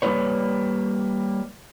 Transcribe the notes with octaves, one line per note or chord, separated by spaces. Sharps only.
G3 A#3 C#4 F4 B4 C#5